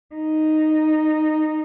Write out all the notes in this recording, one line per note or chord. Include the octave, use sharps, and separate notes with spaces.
D#4